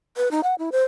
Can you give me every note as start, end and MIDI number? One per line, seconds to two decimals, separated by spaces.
0.17 0.31 71
0.31 0.41 63
0.43 0.55 78
0.59 0.70 64
0.72 0.85 72